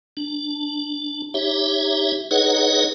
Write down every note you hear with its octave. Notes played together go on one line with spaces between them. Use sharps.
D4
D#4 G4 C#5 E5
D#4 G#4 B4 C#5 D#5 F#5